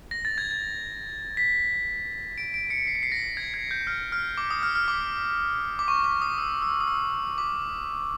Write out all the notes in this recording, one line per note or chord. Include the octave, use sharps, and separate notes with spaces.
A#6
A6
G#6
A6
B6
D7
D7
C#7
C7
C#7
C7
A#6
G#6
G#6
G6
F6
F6
D6
D#6
F6
F6
D6
D6
C#6
D6
D#6
E6
E6
D#6
E6
D6